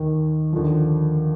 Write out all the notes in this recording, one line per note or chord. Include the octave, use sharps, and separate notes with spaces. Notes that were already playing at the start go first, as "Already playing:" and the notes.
Already playing: D#2 D#3
D#2 D3 F3